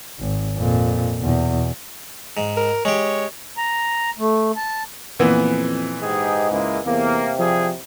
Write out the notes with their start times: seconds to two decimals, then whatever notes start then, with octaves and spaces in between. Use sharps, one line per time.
0.20 G#1
0.58 F2 A#2
1.20 E2 B2
2.37 G#2
2.57 A#4
2.85 G#3 G4 C#5
3.58 A#5
4.18 A3
4.57 A5
5.19 F2 A#2 E3 B3
6.01 G#2 D#4 G4 G#4
6.51 C#2 G#3 A#3 E4
6.86 E2 C3 A#3
7.39 F3 G3 G4 G#4